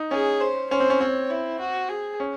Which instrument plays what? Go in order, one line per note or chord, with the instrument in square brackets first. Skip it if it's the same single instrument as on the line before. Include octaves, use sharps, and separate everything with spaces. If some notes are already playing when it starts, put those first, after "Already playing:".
Already playing: [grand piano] D#4
[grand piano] C#4 [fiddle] G#4
[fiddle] C5
[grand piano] C#4 [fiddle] C5
[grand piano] C4
C#4
[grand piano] C4 [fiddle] C#5
[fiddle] E4
F#4
G#4
[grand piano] C#4